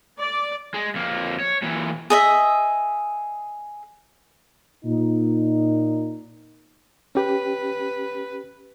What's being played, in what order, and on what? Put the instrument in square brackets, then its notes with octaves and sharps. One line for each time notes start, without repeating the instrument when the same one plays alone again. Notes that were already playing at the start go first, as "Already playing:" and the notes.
[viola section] D5
[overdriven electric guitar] G#3
F2 A#3
C#5
A#2 E3
[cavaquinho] G#4 D#5 E5
[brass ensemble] A#2 D#4
[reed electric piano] C#4 G4 [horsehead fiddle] B4